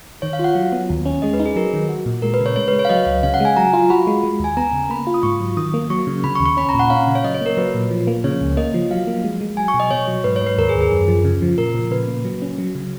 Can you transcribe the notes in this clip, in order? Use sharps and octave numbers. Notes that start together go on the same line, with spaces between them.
D#3 C#5
F5
F4
F#5
F#3
B3
D#2
C#4
G#3 D#5
B4
D#4
G#4
F#3 A#4
D#3
F#4
A#2
G#3 A#4
B4
C#3
C#5
G#3 C#5
B4
G#3
C#5
F5
F#3 D#5
C#2
C#3 F5
F#5
G#3 G#5
F#3 A#5
F4
F#4 B5
G#3
G#3
D#2 G#5
B3 A#5
C#3
A#3 B5
F4
D#6
G#2 C#6
F#3
D#3 D#6
A#3
F#3 C#6
C#3
C#3 B5
C#6
D#2
C#6
C#4 B5
A#5
A#2
F#5
C#4 F5
C#3
C#5
F#3 D#5
C#5
A#3 A#4
F#3 B4
A#2
F3
A#3
C#3 C#5
C#2
A#3 D#5
F3
F#3 F5
A#3
G#3
G#3
F#3 G#5
C#6
B2
D#5
B2 C#5
F#3
G#2 B4
C#5
G#2 B4
D#2 A#4
G#4
D#2
G#4
F#2
F3
C#3
F3
A#2 A#4
A#2
C#3 B4
A#3
F#3
C#4
F#3
C#3